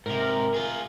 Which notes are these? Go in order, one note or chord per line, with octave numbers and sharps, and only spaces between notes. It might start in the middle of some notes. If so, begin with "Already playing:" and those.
G#2 C3 A#4
F4 G#4